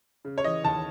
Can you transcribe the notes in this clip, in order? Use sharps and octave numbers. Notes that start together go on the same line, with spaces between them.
C#3
C#5
E3 D#5
D#2 A5